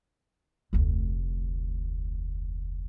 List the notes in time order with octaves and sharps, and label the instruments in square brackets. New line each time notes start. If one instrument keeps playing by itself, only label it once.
[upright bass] F1 D2